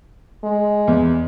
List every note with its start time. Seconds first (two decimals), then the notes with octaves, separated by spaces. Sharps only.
0.44 G#3
0.87 E2